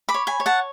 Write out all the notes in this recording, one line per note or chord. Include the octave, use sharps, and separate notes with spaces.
B5 D6
C#5
G#5 B5
C#5
F#5 A5